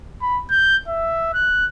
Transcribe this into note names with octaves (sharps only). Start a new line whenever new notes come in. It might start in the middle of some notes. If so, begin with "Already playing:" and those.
B5
G6
E5
F#6